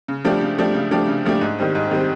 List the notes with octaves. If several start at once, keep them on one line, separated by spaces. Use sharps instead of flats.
C#3
F3 A3 D4 G4
C#3
F3 A3 D4 G4
C#3
F3 A3 D4 G4
C#3
F3 A3 D4 G4
G#2
D#3 G3 C4
G#2
D#3 G3 C4